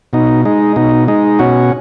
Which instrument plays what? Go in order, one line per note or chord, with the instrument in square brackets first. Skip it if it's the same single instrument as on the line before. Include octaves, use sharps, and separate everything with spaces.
[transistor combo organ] B2 D#4
G#3 D#4
B2 D#4
G#3 D#4
B2 C#4 F#4